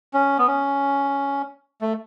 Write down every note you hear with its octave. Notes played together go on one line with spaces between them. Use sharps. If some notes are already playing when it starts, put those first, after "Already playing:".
C#4
B3
C#4
A3